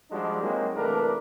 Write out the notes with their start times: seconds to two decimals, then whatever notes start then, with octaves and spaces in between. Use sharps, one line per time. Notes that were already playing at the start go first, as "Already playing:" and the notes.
0.11 F3 G3 G#3 D4 D#4 F#4
0.41 F#3 G#3 A#3 C4 D#4
0.76 C2 E3 A3 D4 A#4 B4